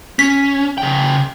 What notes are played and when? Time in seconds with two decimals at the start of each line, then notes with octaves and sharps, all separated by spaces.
0.19 C#4 B6
0.78 C#3 G5